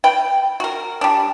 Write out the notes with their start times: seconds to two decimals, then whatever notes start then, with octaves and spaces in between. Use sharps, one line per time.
0.04 B4 G5
0.60 F#4 A#4
1.01 G3 D4